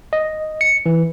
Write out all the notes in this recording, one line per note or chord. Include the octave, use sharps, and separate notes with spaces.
D#5
C#7
E3